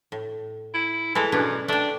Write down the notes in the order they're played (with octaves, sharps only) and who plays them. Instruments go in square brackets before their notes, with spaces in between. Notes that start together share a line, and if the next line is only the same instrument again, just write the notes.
[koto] A2
[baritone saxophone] E4
[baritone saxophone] E3 [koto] G#3 A3 A4
[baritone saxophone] F#2 [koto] B2 D4 B4
[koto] A3 G5 [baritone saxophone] D4